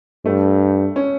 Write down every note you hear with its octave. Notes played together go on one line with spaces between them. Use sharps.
G2 A3
C#4